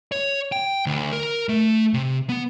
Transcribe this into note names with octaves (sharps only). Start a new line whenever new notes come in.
C#5
G5
D2
A#4
A3
C3
B3